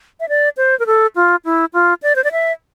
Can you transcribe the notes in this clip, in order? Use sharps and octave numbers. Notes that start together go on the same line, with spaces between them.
E5
D5
C5
A#4
A4
F4
E4
F4
D5
C5
D5
E5